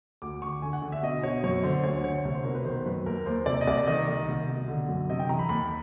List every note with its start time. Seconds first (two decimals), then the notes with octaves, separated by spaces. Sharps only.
0.22 D2 D6
0.42 D3 C#6
0.62 D3 G#5
0.73 F#5
0.82 D3
0.92 E5
1.03 B2 D#5
1.23 B2 C#5
1.43 F#2 C#5
1.63 D3 C5
1.84 D2 C#5
2.04 D3 C#5
2.24 C2 C#5
2.35 C5
2.44 B2 A#4
2.55 B4
2.65 D#3 C5
2.86 F#2 B4
3.06 D#2 A#4
3.26 D#2 C5
3.46 C3 D5
3.61 D#5
3.67 C2 D5
3.87 D#3 D#5
4.07 D#3 D#5
4.28 C2
4.48 B2
4.68 D3
4.89 F#2
5.09 C3 D#5
5.19 G5
5.29 E3 A#5
5.39 B5
5.49 D#2 B5